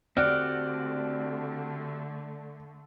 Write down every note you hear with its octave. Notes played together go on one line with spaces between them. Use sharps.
D3 A3 C4 F#4 G4 D5 F6 F#6